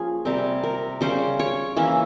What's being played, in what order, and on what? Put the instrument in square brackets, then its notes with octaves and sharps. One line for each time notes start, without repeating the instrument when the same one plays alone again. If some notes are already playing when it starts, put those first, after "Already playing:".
Already playing: [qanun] F3 A#3 C#4 G#4
C3 G3 C4 A#4
A#4
C#3 G3 C#4 C5
C#5
E3 A#3 C#4 E5